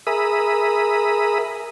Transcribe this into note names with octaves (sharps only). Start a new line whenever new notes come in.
G#4 A#4 E5 B5 D#6